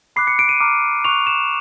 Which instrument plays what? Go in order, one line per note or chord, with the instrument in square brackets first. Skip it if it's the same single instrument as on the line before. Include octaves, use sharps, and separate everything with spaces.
[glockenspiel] B5 D6 F#6 C7
C#7
D7
D#7
A#5 D6 F6
C#6 F#6 F7
E7